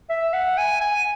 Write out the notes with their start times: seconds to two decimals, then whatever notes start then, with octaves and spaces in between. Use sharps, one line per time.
0.09 E5
0.33 F#5
0.58 G#5
0.81 G#5